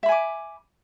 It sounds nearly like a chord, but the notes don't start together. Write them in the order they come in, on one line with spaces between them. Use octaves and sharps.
E5 B5 G#5 D6